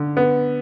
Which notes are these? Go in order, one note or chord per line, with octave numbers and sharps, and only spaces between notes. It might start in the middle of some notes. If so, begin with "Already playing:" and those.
Already playing: D3
B3